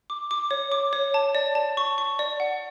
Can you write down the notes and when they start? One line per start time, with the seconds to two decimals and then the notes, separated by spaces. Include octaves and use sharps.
0.10 D6
0.31 D6
0.51 C#5
0.72 D6
0.93 C#5
1.14 A5
1.35 D5
1.55 A5
1.77 C#6
1.98 C#6
2.19 D5
2.40 F#5